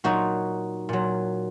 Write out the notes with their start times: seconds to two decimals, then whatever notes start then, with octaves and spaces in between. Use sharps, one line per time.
0.04 A#2 F#3 D#4 F#4
0.89 A#2 F#3